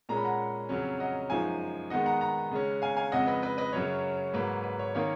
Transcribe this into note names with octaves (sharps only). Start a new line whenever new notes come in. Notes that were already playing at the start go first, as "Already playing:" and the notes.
A#2 G#3 C#4 A#5
B5
F#5 A#5
F2 C#3 F#3 C#4
D#5 F#5
F#2 F3 G#3 D#4 F5 G#5
D#3 G#3 B3 D#4 D#5 F#5
F#5 A#5
F#5 A#5
C#3 G#3 C#4
F5 G#5
F5 G#5
F2 C#3 G#3 D#5 F#5
B4 D#5
B4 D#5
B4 D#5
F#2 C#3 F#3 C#4 C#5
G#2 F#3 A#3 B4
B4
C#5
D#3 A#3 C#4 C#5 F5